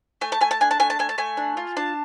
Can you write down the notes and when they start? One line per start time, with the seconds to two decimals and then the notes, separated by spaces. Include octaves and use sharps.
0.21 A3 G#5
0.32 A5
0.41 A3 G#5
0.51 A5
0.60 D4 G#5
0.71 A5
0.80 A3 G#5
0.90 A5
0.99 A3 G#5
1.09 A5
1.18 A3 G#5
1.37 D4
1.57 F4
1.77 D4 A5